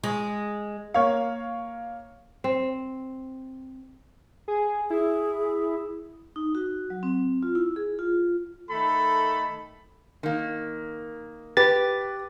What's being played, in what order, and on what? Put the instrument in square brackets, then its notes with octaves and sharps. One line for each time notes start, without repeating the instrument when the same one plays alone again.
[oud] G#3
[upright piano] A#3 C#5 F5
[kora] C4
[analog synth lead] G#4
[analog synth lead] E4 [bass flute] G#4
[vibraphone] D#4
F#4
F#3
C4
F4
E4
G#4
F4
[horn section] D#3 A3 A4 B5
[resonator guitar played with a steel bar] D#3 A#3
[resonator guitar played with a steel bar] G4 [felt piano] B4 [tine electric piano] A6